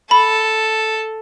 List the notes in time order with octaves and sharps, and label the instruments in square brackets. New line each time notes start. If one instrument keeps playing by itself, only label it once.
[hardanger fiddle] A4 [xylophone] B5